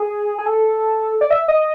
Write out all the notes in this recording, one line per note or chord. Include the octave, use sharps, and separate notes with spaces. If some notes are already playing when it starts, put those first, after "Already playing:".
Already playing: G#4
G#4
A4
D5
E5
D#5